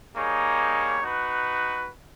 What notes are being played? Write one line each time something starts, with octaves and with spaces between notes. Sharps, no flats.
G3 A#3 D#4 G#4 C#5
D#4 F#4 B4